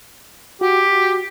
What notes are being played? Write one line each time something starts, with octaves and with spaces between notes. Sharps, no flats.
F#4 G4